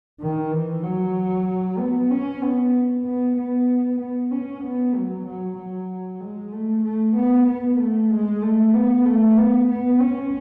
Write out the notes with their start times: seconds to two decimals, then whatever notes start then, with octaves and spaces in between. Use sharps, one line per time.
0.21 D#3
0.52 E3
0.83 F#3
1.79 B3
2.10 C#4
2.42 B3
3.05 B3
3.37 B3
4.00 B3
4.31 C#4
4.63 B3
4.95 F#3
5.26 F#3
5.58 F#3
6.21 G#3
6.53 A3
6.84 A3
7.16 B3
7.48 B3
7.79 A3
8.11 G#3
8.42 A3
8.74 B3
9.05 A3
9.37 B3
9.69 B3
10.00 C#4